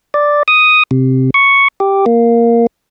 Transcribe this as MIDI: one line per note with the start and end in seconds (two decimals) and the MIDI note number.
0.14 0.43 74
0.48 0.83 87
0.91 1.30 48
1.34 1.68 85
1.80 2.05 67
2.06 2.67 58